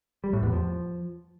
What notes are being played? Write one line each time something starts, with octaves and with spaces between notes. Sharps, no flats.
G3
A2
E2
F3